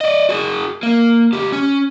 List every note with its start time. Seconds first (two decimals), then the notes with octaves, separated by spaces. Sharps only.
0.01 D5 D#5
0.29 F#4 G#4
0.83 A#3
1.33 C#2 G4
1.52 C#4